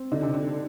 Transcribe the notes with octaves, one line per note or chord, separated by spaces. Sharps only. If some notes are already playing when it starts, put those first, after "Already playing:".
Already playing: C4
D3 D#4
C3
D3